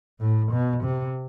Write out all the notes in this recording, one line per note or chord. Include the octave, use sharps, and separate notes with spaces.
A2
B2
C3